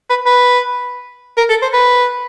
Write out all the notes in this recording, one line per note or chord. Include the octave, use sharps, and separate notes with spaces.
B4
B4
A#4
A4
C5
B4